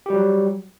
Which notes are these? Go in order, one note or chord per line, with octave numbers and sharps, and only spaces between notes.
F#3 G3 G4